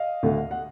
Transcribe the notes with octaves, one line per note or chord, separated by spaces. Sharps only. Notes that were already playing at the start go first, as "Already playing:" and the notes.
Already playing: D#5 F5
D2 D3
F#5